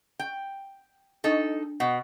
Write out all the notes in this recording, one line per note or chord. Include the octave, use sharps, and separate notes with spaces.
G5
D4 D#4 A4
B2 F#5